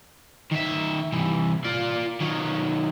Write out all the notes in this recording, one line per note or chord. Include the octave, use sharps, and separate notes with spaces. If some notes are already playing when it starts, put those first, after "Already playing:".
D#3 E5
C2 E3
F4 D5
D#3 F#3